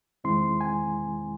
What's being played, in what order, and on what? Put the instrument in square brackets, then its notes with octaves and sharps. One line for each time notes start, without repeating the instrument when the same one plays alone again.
[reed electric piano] E2 D#3 G#3 C4 E4 C6
G#5